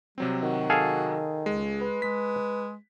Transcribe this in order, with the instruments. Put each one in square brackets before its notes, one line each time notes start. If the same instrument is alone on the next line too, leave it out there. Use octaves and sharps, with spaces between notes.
[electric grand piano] C3 F#3 C4 [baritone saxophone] G3
[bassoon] D#3 [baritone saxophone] F#4
[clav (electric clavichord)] G#4 A4 F5
[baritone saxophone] C#2 [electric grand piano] G#3
[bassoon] B4
[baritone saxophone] G#3 [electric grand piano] B6